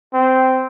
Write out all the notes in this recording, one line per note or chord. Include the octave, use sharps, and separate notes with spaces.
C4